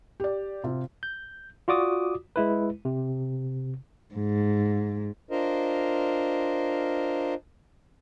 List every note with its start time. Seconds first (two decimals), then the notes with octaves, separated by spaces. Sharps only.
0.20 G4 D5
0.64 C3 F4
1.03 G6
1.68 F4 F#4 D5 D6 D#6
2.36 G#3 E4 B4
2.85 C3
4.14 G#2
5.31 D4 F4 A#4 C5 D#5